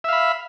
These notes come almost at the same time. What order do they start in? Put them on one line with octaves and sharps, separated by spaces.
E5 F5 B5